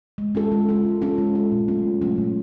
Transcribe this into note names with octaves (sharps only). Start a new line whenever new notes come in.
G#3
C#4 F4 A4
G#3
C#4 F4 A4
G#3
C#4 F4 A4
G#3
C#4 F4 A4
A#2
F#3 A3 C#4 F4
A#2
F#3 A3 C#4 F4
A#2